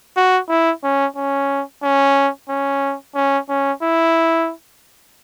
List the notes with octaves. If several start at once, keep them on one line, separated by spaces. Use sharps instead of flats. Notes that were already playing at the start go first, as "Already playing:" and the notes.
F#4
E4
C#4
C#4
C#4
C#4
C#4
C#4
E4